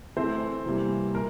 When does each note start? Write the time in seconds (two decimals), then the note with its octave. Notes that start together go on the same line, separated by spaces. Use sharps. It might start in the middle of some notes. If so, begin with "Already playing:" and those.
0.16 E3 A3 C4 C5
0.65 C3 E3 G3 A#3
1.14 A#2 A#4